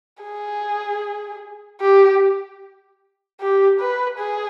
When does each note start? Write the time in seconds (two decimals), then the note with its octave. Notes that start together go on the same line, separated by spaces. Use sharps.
0.23 G#4
1.81 G4
3.40 G4
3.80 B4
4.19 G#4